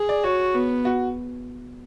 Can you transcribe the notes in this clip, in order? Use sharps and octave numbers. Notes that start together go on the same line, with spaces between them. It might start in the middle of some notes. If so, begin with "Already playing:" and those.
Already playing: G#4
D5
F#4 C#5
B3
F#4